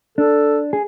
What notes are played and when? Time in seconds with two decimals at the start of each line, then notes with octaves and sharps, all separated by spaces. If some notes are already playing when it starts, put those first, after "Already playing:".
0.18 D4 A4
0.73 G#4